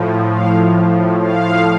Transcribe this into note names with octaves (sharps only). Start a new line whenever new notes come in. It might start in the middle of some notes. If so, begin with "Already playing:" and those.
Already playing: A2 F3
F5
F5